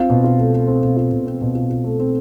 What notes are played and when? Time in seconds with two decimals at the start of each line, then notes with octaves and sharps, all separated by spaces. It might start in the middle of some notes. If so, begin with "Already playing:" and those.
Already playing: C4 F4
0.10 B2
0.24 F4
0.38 A3
0.53 A3
0.67 C4
0.82 B2
0.97 F4
1.12 B2
1.26 C4
1.41 B2
1.55 F4
1.70 F4
1.84 A3
2.00 C4